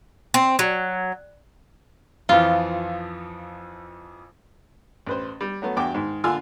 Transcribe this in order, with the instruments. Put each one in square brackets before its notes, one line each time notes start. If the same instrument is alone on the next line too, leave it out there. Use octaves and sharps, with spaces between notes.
[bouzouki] C4
F#3
[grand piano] F2 E3 F3 [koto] F4
[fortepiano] A1 B4 C5
G3
F#3 A3 B3
E2 G2 F#4 G5 D6
G#2 D#3
A#1 D3 F4 G#5 E6